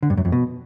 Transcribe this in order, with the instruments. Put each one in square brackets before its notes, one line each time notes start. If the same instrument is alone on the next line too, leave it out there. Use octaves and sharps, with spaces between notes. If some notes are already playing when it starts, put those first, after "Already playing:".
[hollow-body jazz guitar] D3
G2
F#2
F2
B2